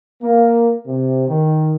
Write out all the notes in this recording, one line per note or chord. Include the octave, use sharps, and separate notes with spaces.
A#3
C3
D#3